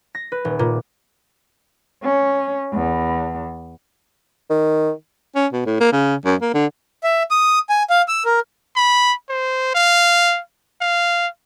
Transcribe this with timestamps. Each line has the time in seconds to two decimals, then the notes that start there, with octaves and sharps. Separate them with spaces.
0.15 A#6
0.32 B4
0.45 D#1
0.59 A#2
2.03 C#4
2.73 E2
4.50 D#3
5.35 C#4
5.53 B2
5.66 A2
5.80 A#3
5.92 C#3
6.25 F#2
6.42 A#3
6.54 D3
7.04 E5
7.31 D#6
7.69 G#5
7.90 F5
8.08 E6
8.25 A#4
8.76 B5
9.29 C5
9.75 F5
10.81 F5